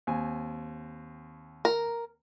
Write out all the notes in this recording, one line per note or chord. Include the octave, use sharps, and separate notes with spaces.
D#2 C4 G#5
A#4